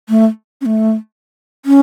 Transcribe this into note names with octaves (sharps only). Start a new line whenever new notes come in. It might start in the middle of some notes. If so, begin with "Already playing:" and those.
A3
C#4
A3
C#4